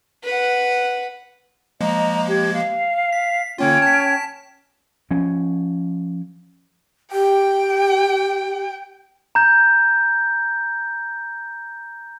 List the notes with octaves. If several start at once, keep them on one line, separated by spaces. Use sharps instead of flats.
B4 F#5
F3 G#3 A#3 D#5 A#5
G4 G#6
F5
B6
D3 A#3 C#4 F4 G5 G#6
A5 B6
F3 C#4
G4 G5
A#5 G6